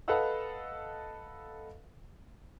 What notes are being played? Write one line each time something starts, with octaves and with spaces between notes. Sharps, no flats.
A4 B4 D#5 F5 F#5 E6